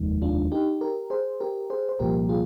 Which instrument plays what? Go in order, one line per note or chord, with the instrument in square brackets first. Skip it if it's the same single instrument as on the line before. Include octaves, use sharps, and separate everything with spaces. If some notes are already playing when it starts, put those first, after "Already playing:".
Already playing: [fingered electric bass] F1 D#2 D#3 G#3
[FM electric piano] D4 F4
D#4 G4
G4 A#4
G#4 C5
G4 A#4
G#4 C5
C5
[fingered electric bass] C2 A#2 F3 [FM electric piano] G4 A#4
[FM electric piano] F4 G#4